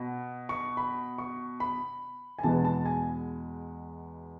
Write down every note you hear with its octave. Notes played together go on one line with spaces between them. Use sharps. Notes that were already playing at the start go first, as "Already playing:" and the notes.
Already playing: B2
C#6
B5
C#6
B5
G#5
E2 B2 G#3 B3 A5
A5
G#5